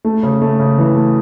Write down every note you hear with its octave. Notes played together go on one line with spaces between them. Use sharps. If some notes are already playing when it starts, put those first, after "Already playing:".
A3
C#3
A3
C#3
E3
A3